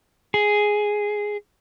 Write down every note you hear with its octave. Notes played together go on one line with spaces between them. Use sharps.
G#4